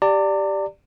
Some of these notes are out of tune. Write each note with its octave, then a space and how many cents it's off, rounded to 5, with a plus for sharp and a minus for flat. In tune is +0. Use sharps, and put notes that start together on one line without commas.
G4 +0 D5 +0 A#5 -45